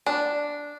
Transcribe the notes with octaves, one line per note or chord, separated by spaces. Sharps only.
D4